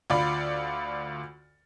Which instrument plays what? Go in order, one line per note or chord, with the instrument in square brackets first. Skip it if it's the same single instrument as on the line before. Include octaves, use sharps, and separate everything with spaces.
[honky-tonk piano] D2 F4 D5 B5